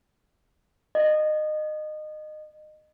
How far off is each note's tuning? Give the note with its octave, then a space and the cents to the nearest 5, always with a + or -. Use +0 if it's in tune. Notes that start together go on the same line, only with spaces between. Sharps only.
D#5 -25